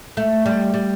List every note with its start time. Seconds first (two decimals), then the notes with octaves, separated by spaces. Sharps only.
0.17 A3
0.46 G3
0.74 G3